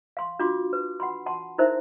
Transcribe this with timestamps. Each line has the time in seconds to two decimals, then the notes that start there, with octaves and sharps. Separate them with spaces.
0.17 F5 C6
0.39 D4 F4 F#4 C6 D6
0.73 B4
1.00 F#5 B5 C6
1.26 F#5 A5 C6
1.58 D#4 E4 A#4 C5 E5